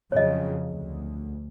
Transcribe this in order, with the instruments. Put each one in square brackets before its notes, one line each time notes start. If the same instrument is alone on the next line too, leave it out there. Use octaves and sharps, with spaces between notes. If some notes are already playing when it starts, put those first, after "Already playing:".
[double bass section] F2 C#3 F#3 [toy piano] C#5 D#5
[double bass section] D2